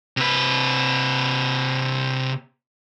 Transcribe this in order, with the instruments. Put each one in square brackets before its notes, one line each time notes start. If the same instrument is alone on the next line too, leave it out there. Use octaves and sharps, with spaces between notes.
[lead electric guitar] C3 B4